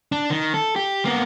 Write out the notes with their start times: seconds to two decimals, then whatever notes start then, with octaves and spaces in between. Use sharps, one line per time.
0.12 D4
0.30 D#3
0.54 A4
0.76 G4
1.05 A#3 B3